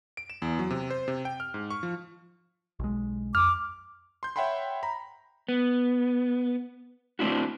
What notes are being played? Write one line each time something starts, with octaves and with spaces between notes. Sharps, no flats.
D7
E7
E2
F#3
C3
C5
C3
G5
F6
G#2
C#6
F3
B1 G#3
F2 D6 F6
C6 G6
C#5 E5 F#5 G5 B5 C6
A#5 B5
B3
A3 C4 D4 E4 F#4